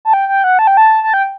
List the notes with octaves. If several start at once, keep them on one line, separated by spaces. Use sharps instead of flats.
A5
G5
G5
F#5
A5
G5
A5
A5
G5